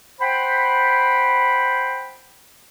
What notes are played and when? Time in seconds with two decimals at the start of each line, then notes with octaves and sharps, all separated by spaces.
0.21 C5 F#5 G5 B5